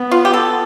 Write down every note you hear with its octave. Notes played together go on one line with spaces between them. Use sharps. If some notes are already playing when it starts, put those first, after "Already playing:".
Already playing: B3
F4
G4
A4